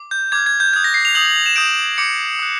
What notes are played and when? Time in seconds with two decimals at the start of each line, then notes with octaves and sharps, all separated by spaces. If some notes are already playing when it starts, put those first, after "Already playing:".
Already playing: D6
0.11 G6
0.32 D6 F6 G#6
0.46 G#6
0.60 G6
0.73 D#6 F#6 G#6
0.84 A#6
0.94 C7
1.05 F7
1.15 D#6 G6 F#7
1.26 F#7
1.36 F7
1.46 E7
1.56 D#6 G6 D7
1.98 D6 G6 C#7
2.39 D#6 F#6